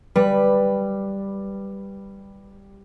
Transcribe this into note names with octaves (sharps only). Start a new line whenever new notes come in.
G3 B4